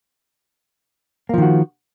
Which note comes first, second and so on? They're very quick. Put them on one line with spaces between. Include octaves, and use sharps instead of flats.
A#3 F3 D#3 F#4